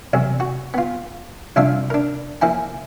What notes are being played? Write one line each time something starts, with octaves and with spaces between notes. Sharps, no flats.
B1 E2 C3
F#4
B3 F4
C2 F2 D4 F4 E5 F5
D4 A#4
F3 A#3 E4 G#5